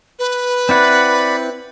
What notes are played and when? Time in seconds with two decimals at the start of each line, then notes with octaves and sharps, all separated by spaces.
0.19 B4
0.69 C4 E4 D5 F#5 B5